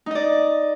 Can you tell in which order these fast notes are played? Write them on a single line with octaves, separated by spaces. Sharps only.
D#4 D#5 D5